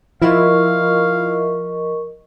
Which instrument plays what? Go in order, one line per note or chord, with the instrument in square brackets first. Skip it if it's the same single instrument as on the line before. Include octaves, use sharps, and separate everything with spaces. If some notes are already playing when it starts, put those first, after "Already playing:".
[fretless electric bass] F3 [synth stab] E4 F4 [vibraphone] A#4 D#5 C#6 [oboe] F5